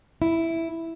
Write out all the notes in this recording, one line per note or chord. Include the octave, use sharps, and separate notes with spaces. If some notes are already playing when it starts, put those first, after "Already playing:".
E4